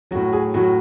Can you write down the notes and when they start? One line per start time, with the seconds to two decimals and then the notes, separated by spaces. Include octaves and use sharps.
0.11 A2 F#3 F#4
0.33 G#4
0.54 A2 F#3 F#4